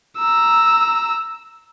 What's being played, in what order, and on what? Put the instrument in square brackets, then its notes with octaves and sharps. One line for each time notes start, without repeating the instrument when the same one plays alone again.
[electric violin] A#5 E6